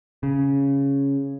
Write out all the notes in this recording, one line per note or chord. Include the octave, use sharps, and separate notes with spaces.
C#3